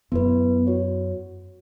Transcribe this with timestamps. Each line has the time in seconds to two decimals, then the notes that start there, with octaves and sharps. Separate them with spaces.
0.12 F#2 B3 E4 B4
0.67 F#4 C#5